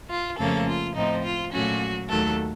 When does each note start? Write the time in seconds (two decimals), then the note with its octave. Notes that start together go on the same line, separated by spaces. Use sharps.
0.10 F4
0.38 F2 C#3 F3 A3 A#3 C#4 A4
0.67 F4
0.96 A2 F3 C4 D#4
1.24 F4
1.52 A#2 F#3 A3 C#4 F#4
2.09 D#2 D#3 F#3 A3 A4